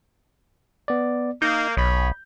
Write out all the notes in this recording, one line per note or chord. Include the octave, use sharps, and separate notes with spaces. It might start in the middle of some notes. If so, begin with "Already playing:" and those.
B3 D5
A#3 D#4 G6
B1 C#5 D#5 B5